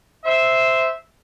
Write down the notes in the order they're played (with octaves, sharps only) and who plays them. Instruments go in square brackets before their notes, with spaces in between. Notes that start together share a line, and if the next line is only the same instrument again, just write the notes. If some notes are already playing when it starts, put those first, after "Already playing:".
[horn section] C5 E5